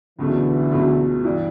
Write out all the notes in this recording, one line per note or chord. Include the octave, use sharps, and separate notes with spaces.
C#2 B2 D3 E3 F#3 A3
C#2 B2 F#3 A3
G2 E3